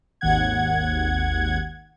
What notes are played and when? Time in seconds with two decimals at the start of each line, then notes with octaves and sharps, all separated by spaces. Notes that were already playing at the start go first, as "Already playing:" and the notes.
0.21 G#1 D#2 F#5 G#6